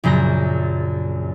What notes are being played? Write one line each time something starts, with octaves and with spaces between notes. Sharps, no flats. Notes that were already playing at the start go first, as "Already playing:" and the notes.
A#1 F#2 C#3 G6 A#6